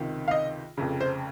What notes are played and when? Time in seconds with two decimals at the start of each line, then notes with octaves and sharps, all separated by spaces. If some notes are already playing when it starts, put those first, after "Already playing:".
Already playing: C#2 C3 D#3
0.28 F5
0.31 D#5
0.77 F1 F2 C#3
1.01 C5